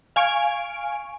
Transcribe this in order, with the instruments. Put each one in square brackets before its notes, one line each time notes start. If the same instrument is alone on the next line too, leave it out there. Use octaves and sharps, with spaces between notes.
[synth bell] F5 G#5 C#6 D7